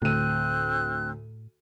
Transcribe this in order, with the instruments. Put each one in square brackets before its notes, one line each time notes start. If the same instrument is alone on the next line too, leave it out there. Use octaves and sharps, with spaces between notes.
[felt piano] D2 D#7 [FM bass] A2 [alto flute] C4 [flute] F#6